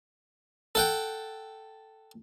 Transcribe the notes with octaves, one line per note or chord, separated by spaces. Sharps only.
A4 F#5 G5